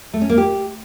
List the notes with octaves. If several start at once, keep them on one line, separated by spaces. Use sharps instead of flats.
A3
C#4
A#3
G4